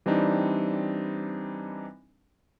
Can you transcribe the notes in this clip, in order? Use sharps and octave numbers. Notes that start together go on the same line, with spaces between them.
E3 G3 C4 D4 D#4